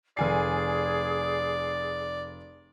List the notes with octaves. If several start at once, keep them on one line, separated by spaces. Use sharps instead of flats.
F1 G#4 D5 G#5 C7